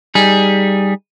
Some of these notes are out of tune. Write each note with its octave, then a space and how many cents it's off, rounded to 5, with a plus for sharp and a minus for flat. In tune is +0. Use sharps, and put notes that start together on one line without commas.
G3 +0 D#4 +0 G#4 +0